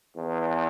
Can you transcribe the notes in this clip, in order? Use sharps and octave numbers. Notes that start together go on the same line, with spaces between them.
E2